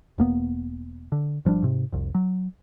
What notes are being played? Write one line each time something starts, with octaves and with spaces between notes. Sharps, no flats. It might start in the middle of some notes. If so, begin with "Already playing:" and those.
E1 A#3 B3
D3
G#1 F3 G3 D4
G#2 C3
F1 C2
F#3